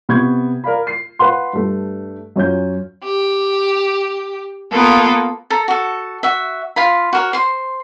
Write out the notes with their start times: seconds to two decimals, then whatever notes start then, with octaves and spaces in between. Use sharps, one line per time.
0.09 C3 B3 C#6 G6 G#6
0.64 A#4 D5 F5 B5
0.87 C7
1.19 B4 F5 F#5 C6
1.53 G2 A3
2.36 F#2 C#4 F4 G6
3.04 G4
4.72 A#3 B3 F4 A4
5.50 A4 A#5
5.68 F#4 A4
6.23 F#4 E5
6.76 F4 F5 B5
7.13 F#4 A#4 C#5
7.33 C5 C6